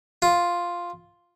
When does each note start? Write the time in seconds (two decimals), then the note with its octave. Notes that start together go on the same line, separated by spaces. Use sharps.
0.22 F4